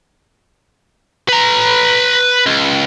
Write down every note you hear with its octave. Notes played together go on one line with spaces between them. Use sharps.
B4 A#5
C#2